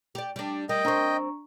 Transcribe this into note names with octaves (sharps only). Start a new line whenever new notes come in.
G4 D5
G3 D4
G3 A#4 D#5 G5
C4 D4 C5 A#5 C#6